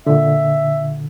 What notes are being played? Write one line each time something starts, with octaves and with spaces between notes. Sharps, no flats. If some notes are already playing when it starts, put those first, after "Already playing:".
A#2 D3 E5